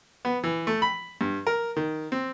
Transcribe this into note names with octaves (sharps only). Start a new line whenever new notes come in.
B3
E3
A3
B5
G2
A#4
D#3
C4